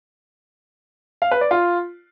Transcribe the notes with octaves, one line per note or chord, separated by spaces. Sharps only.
F5
B4
D5
F4